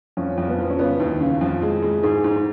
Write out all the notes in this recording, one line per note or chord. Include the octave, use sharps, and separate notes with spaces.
F2 C#4
F2
B3
F3
C#4
C#3 B3
D#2
C#3
F2
G#3
G#3
G#2 G#4
G#2